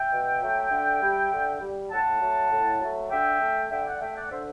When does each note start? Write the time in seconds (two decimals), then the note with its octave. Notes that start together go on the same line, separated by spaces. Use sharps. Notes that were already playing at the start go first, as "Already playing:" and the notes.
Already playing: E5 G5
0.12 B2
0.42 F#3 A3
0.72 D3
1.02 G3
1.32 D3
1.61 G3
1.91 A2 F#5 A5
2.21 F#3 A3
2.51 A2
2.81 F#3 A3
3.11 D3 E5 G5
3.41 A3
3.70 D3 E5 G5
3.86 D5 F#5
4.00 A3 E5 G5
4.16 D5 F#5
4.30 D3 C5 E5